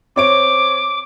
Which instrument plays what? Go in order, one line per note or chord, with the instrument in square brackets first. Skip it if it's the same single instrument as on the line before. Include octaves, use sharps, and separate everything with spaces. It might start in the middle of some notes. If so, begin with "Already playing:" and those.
[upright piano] C4 C#5 D7 [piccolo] D6